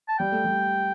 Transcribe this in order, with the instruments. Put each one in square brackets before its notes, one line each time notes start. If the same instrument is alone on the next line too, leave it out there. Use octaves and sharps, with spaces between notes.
[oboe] A5
[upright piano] G3 [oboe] G5
[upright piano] A3
G3